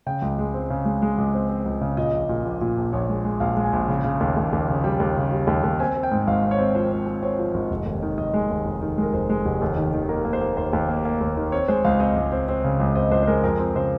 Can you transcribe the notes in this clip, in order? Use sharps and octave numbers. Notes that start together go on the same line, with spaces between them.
C#3 G5
C#2
G#3
C4
C#3
G#3
G#3
C#2
C4
C4
C#2
C#3
A#2 D#5
A#1
A#2
A#1
A#2
A#1
A#1 C#5
G#3
G#3
A#1 F5
G#3
G#5
A#1
C#3
C#3
D#2
D#2
D#2
C#3
G3 G5
D#2
C#3
G3
D#2
D#2
C4 G#5
C4
G5
G#2
G#1 F5
C4
C#5
C4
F3 C5
C4
C4
C4 C#5
F3
G#1
F1
D#2
D#3
F1 D#5
G#3
D#2
F1
D#3
G#3 A#4
F1 C5
G#3
F1
D#2
D#3
D#3
A#3 A#4
A#3
C5
A#3
D#2 C5
D#2
A#3
A#3
D#2
D#3
C4 C#5
G#3 C5
C#2 F5
C4 D#5
C#2
C4
C4
C#3
C#2
C4 D#5
C#2 C5
C5
G#3 A#4
F2 A#4
C4
C#3 C5